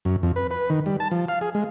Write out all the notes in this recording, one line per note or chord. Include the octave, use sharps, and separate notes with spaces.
F#2
F2
B4
B4
D#3
G3
A5
F3
F5
G#4
G#3